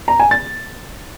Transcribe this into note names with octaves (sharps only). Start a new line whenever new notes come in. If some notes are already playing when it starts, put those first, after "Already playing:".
A#5
G#5
A6